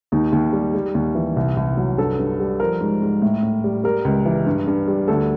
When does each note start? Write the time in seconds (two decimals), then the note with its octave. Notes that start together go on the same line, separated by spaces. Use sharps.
0.12 D#2 D#4
0.32 D#2
0.53 G3
0.75 G3
0.95 D#2
1.15 E3
1.36 C2
1.57 C2
1.77 F#3
1.98 G2 A4
2.19 G2
2.40 G3
2.60 F3 A#4
2.81 G#2
3.02 G#2
3.22 A2
3.43 A2
3.64 G3
3.84 G3 A#4
4.05 C#2
4.25 E3
4.46 G2
4.67 G2
4.88 G3
5.08 D2 A4